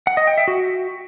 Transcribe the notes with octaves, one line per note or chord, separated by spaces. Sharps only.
F#5
D#5
G5
E5
F#4